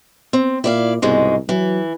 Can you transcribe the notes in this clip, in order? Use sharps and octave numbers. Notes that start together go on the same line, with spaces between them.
C4
A#2 E4 D5 F5
C2 G#2 B2 G#3
E3 F#3